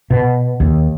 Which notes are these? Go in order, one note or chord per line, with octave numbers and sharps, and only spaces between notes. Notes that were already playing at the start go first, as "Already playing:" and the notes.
B2
D#2